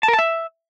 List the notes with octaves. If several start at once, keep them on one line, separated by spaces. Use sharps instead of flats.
A5
A#4
A5
E5